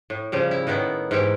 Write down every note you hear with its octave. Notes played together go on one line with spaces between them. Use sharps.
A2
C#3 F3 G3
E4
A2 D#3 B3 E4
G#2 E3 E4 G4